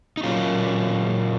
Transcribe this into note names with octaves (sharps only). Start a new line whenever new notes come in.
D#4
A#2 F#3 A#3 C#4 F4